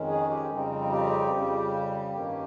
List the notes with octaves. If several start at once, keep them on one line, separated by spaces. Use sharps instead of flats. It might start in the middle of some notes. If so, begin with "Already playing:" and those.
Already playing: F2 D#3 G#3 C#4
G#4
G4
F2 C#3 G3 C4 D#4
G4
F2 C#3 G3
G2 D#3 A#3 C#4